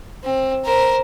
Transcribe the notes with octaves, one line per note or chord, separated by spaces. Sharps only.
C4
A#4 C5